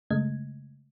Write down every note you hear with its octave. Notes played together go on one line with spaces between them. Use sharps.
F#2 C#3 G#3 A3 D#5 G#6